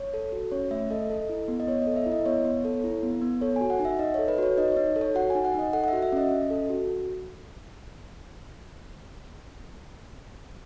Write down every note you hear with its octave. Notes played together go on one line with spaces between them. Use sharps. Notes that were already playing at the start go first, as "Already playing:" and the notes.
Already playing: C#5
A4
F#4
C#4 C#5
A3 E5
A4 D#5
A4
E4
B3
D#5
B3 C#5
A4 D#5
E5
E4
D#5
B3 C#5
B3
A4
E4
B3
B3
A4 C#5
F#4 G#5
F#5
D#4
E5
D#4 D#5
A4 C#5
B4
F#4 C#5
D#4 D#5
D#4 C#5
A4
C#5
F#4 F#5
D#4 G#5
F#5
D#4 D#5
A4 F#5
F#5
F#4 E5
E5
C#4 D#5
C#4
A4
F#4